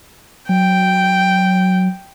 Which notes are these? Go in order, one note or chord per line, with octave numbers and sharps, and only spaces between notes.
F#3 G5